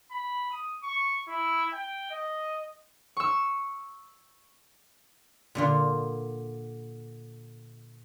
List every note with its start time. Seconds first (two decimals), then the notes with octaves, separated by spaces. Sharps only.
0.11 B5
0.51 D#6
0.83 C#6
1.28 E4
1.73 G5
2.10 D#5
3.17 C#6 E6
5.55 A#2 D3 F4